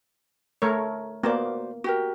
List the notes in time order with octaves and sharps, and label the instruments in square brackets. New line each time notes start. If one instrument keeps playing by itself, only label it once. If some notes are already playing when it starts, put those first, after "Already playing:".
[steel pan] A3 A#4 C#5
[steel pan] A#3 B3 [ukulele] F#4 C5 D5
[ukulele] F#4 G4 A#4